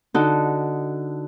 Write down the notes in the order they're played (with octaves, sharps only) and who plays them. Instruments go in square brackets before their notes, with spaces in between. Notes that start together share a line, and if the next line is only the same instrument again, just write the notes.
[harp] D3 D#4 F#4 A4